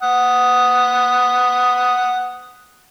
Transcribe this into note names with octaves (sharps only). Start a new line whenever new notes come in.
F#5 D#6